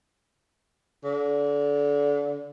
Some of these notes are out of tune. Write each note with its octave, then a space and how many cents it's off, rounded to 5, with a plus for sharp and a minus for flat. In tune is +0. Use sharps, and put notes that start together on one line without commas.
D3 -30